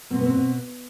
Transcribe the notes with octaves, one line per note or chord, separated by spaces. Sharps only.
B2 C4
B3
C4
B2